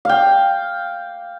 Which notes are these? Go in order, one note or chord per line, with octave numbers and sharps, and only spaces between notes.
F5 G5